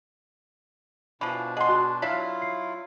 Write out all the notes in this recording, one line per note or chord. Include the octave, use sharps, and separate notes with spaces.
B2 E3 F3 D4 B5
G#4 D#5 F#5 G5 C6
F#4 F#6
F#3 D4 E4 F4 E5 F5 B6
C7